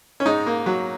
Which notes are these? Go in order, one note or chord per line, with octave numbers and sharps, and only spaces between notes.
C#4
G#2 D#4
A#3
F#3